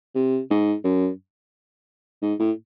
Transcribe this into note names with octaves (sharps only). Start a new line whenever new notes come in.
C3
G#2
F#2
G#2
A2